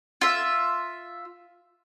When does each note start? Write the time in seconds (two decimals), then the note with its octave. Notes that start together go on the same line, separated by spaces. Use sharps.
0.21 F4 E5